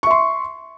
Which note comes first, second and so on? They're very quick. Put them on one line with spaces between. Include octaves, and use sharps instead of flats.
C#6 E5 C6